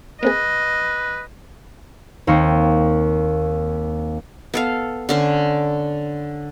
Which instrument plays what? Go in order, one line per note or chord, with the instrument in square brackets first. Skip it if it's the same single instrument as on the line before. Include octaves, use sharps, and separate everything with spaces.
[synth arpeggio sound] A#3 C4 G#4 [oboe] B4 [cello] D#5
[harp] D#2 A#3 C4 C#6
[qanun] B3 A4 F5
D3 C#4 C5